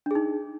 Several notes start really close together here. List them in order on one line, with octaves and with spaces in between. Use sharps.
D4 G#4 D#4